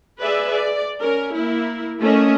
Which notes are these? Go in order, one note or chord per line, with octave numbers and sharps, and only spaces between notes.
G#4 B4 D5 E5
D5
C#4 A#4
A#3 E4
A3 A#3 C#4 D#5